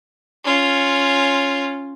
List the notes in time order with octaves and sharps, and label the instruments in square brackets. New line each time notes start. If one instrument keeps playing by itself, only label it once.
[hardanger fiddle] C#4 F4